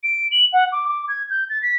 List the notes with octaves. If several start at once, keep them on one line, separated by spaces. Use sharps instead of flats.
D7
F#7
F#5
D6
D6
G#6
G6
A6
B6